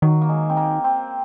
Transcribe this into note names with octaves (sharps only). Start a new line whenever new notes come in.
D#3 F#3
A#3
G#3
C4
A#3
C4